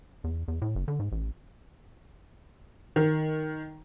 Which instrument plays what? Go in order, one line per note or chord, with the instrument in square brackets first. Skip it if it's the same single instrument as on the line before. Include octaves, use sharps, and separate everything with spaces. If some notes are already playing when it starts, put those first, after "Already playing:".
[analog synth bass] E2
E2
A2
F#1
D3
G#2
A1
[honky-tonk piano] D#3